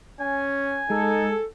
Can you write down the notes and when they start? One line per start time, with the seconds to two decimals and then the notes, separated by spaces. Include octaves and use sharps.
0.20 C#4 G#5
0.90 G#3 D#4 A4